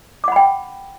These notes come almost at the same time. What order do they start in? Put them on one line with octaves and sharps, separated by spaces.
D6 F#5 B5 G5